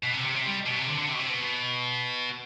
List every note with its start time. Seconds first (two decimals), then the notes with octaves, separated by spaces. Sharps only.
0.04 B2
0.14 C3
0.25 C3
0.35 C3
0.45 G3
0.66 B2
0.77 C3
0.87 D3
0.98 D3
1.09 C3
1.14 B2
1.19 C3
1.29 B2